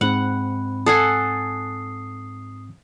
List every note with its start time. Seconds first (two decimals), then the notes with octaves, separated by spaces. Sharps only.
0.01 G#2 C4 F#5 B5
0.86 A4 F#5 G#5 D#6 C7